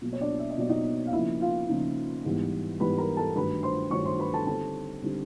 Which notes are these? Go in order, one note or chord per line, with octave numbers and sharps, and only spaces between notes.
B2 F#3 A#3
C#5
D4 D5
E5
D#5
B2 F#3 A#3 D5
D#4 D#5
F5
C#3 F3 A#3 D#4 E4 E5
F4 F5
C#3 F3 A#3 D#4
G#2 E3 G3 B3
G#2 E3 G3 B3 B4 B5
A#4 A#5
A4 A5
G2 D#3 F#3 A3 B4 B5
C5 C6
G2 D#3 F#3 A3 C#5 C#6
C5 C6
B4 B5
A4 A5
D3 G3 C4 D#4 A4 A5
D3 G3 C4 D#4